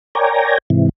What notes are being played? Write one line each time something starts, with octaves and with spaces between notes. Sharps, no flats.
A#4 C#5 D5 G5 G#5 A#5
G#2 C3 E3